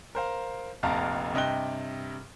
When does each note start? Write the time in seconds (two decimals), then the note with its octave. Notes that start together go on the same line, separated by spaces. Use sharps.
0.15 A#4 C5 F5
0.83 F1 A#1 F2 F5 A5 A#5
1.34 G2 C3 D#5 G5 F#6 G7